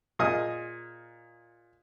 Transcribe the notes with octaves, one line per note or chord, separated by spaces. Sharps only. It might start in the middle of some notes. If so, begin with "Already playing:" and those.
A#2 G#4 D#5 D#6 F6